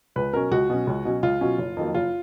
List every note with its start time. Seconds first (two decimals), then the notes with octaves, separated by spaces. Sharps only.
0.16 C#2 B4
0.33 B2 F#3 C#4 A#4
0.51 C#2 F#4
0.70 B2 F#3 C#4
0.87 C#2
1.05 B2 F#3 C#4
1.23 C#2 F4
1.41 B2 F#3 C#4
1.58 F#1
1.77 F2 D#3 F#3 A#3
1.94 F#1 F4